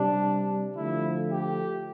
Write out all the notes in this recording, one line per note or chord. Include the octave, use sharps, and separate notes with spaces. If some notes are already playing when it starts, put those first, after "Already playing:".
Already playing: C3 G3 D4
D3 F3 A3 E4
G4